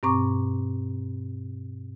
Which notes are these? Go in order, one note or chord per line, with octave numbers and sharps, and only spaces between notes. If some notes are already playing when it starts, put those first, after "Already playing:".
G2 B2 C4 A#5 C#6 D6